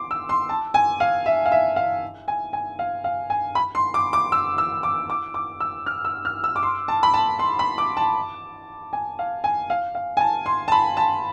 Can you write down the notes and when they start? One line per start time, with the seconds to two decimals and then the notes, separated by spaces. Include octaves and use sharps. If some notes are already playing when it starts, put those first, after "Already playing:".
Already playing: C6 D6
0.11 E6
0.29 C6
0.49 A5
0.74 G#5
1.00 F5
1.26 E5
1.46 F5
1.52 E5
1.76 F5
2.28 G#5
2.53 G#5
2.79 F5
3.04 F5
3.30 G#5
3.55 B5
3.75 C6
3.94 D6
4.13 D6
4.32 E6
4.58 E6
4.83 D6
5.10 D6
5.34 D6
5.60 E6
5.86 F6
6.05 E6
6.25 F6
6.44 E6
6.56 D6
6.63 C6
6.88 A5
7.03 B5
7.14 A5
7.39 C6
7.59 B5
7.78 D6
7.97 A5
8.93 G#5
9.19 F5
9.44 G#5
9.70 F5
9.95 F5
10.17 G#5
10.21 A5
10.46 C6
10.68 A5
10.72 B5
10.97 A5